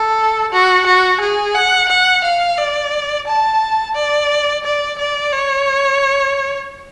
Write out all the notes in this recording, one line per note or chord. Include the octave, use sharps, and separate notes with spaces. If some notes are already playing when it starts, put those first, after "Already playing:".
Already playing: A4
F#4
F#4
G#4
F#5
F#5
F5
D5
A5
D5
D5
D5
C#5